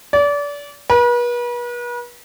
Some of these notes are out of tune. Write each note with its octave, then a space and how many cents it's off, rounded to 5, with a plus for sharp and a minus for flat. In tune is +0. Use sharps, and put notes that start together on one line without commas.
D5 -30
B4 -40